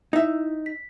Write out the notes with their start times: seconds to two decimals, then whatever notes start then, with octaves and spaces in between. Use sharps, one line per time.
0.13 D#4 E4 E5
0.66 B6